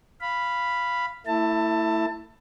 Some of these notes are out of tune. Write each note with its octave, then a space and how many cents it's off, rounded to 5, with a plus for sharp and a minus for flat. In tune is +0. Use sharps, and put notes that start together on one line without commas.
F5 -10 B5 +0
A3 +35 E4 +0 A5 +20